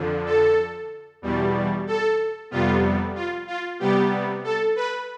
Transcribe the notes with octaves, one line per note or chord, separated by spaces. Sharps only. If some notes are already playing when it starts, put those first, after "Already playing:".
Already playing: F2 D3 F3
A4
E2 B2 G3
A4
F2 C3 G3 B3 F4
F4
F4
C3 G3 B3 G4
A4
B4